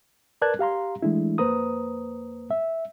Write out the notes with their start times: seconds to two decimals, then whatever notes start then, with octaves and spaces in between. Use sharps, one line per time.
0.42 A#4 B4 D5 A5 F#6 G#6
0.59 G4 F5 A#5 C6
1.02 E3 G#3 A3 D4 E4
1.38 F2 A#3 B4 C5 A#5 D#6
2.51 E5